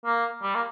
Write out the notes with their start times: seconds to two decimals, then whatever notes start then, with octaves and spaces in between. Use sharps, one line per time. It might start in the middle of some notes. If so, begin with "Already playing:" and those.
0.06 A#3
0.42 G3
0.55 A#3